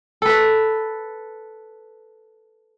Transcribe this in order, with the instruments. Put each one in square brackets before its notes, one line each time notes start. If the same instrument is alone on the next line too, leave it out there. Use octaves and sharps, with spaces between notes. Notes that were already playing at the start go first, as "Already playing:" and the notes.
[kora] A4 B4